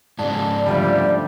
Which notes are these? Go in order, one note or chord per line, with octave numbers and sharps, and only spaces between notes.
G#2 C#3 D5 A5
D3 F3 G3 A3